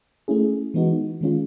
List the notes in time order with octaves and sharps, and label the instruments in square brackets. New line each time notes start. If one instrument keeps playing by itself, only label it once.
[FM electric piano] A3 C#4 E4 G#4
E3 G#3 B3 D#4 F#4
D#3 G#3 C#4 F4